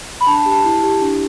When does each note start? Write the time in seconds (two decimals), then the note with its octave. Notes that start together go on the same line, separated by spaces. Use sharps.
0.21 B5
0.27 D4 A5
0.40 A5
0.46 G4
0.52 A5
0.64 E4
0.83 G4
1.01 D4